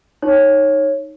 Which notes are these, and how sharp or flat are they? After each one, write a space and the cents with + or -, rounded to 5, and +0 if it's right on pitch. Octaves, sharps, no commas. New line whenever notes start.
D#4 +0 C#5 -10